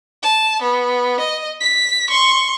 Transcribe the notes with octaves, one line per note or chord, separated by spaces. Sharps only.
A5
B3
D#5
B6
C6 C#6